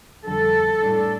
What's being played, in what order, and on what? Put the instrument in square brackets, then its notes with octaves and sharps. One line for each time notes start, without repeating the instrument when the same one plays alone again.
[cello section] F2 D3 G3 A4
A2 G3 D4